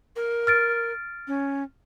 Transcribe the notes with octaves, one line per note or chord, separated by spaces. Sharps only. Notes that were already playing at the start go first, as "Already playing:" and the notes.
A#4
F6 A6 D7
C#4